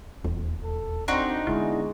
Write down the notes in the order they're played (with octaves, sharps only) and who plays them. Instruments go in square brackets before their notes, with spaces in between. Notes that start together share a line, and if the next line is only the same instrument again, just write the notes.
[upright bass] D#1 [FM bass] E2
[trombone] A4
[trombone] C4 [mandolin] D4 D#4 F#4
[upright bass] D3 B3 [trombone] G#3 [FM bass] E4